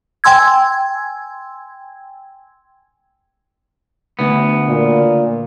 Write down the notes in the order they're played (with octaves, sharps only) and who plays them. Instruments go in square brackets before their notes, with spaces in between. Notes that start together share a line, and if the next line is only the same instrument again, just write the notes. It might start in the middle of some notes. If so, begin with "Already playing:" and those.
[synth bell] G5 G#5 C6 E6 G#6
[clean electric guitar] D2 B3
[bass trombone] A#2